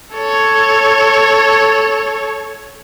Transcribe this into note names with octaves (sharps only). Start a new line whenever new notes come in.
A4 C#5